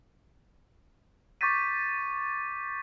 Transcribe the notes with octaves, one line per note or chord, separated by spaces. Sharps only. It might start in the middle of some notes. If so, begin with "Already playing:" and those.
C#6 D6 G6 A6 B6 D#7